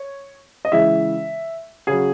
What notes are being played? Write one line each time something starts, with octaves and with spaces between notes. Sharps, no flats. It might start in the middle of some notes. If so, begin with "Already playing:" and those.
Already playing: C#5
D#5
C#3 E3 G#3 E5
C#3 F#3 G#4